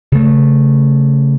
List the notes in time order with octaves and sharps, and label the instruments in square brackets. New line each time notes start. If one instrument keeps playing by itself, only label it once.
[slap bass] C#3 A3